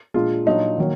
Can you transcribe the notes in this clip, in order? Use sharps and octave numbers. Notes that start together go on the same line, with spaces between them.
A#2 G#3 D4 F4
A#2 F#3 D4 D#4
D#3 F#3 A#3